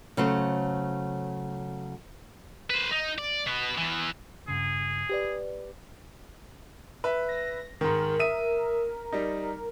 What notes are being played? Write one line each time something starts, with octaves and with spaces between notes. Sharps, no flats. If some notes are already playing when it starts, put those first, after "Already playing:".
C#3 F#3 A3 C5
B4 C5
D#4
D5
B2 B3
E2 E3
G2 C#3 G#4
G4 B4 D5
B4 E5
A#6
G#2 D#3 A#4
E5 D#6 D#7
G3 D#4